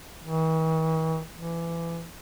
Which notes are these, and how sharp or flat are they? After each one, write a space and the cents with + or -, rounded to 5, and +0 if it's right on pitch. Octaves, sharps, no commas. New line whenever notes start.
E3 -45
E3 +25